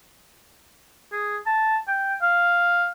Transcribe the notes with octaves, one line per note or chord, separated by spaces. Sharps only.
G#4
A5
G5
F5